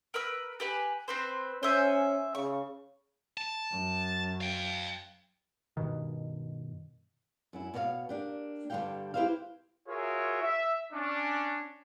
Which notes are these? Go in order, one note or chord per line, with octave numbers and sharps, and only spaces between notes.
A#4 B4 E6
G4 B4 G#5
C4 B4 C5
C#4 C5 E5 G#5
C#3 C#6
A5
F#2
F5 G5
G2 B2 D#3
F#2 C#4 E4
B2 B4 C#5 D5 F5
A#3 D4 G4
G2 D3 G3 G4 F5 G5
E4 G4 B4 C5 E5 F5
F4 F#4 G#4 A#4 C#5 E5
E5
C#4 D4